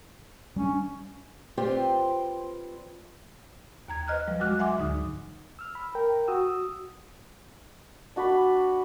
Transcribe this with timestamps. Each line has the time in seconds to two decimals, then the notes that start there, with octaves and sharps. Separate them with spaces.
0.56 G3 C#4 D4
1.57 C4 F4 G4 B4 C5 D5
3.88 D#2 A#5 G#6
4.08 B4 C5 D#5 F6 F#6
4.28 F3 G3
4.40 F#3 G#3 F#4 D6 F6 F#6
4.59 E5 F#5 G#5 C6 D6
4.77 D2 G#2 D3 D#4 D#6
5.59 E6 F6
5.75 B5
5.95 A#4 G5
6.28 F#4 D#6 E6
8.16 D4 F#4 D5 B5